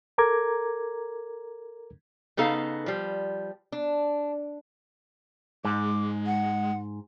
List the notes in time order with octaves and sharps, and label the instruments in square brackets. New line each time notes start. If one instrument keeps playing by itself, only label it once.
[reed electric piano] A4 A#4 A#5 D6 G#6
[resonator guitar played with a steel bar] C#3 B3 D#4 A4 F5
F3 G3
D4
[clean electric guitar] G#2 [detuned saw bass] G#3 [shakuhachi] D6
[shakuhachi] F#5